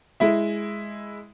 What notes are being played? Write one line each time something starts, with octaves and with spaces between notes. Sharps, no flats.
G#3 E4 E5